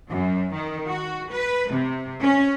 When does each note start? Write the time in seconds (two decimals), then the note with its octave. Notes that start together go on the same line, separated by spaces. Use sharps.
0.10 F#2
0.53 D#3
0.88 F#4
1.31 B4
1.70 C3
2.22 C#4